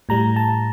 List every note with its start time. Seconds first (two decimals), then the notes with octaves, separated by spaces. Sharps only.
0.09 A2 G3 A#5
0.36 A5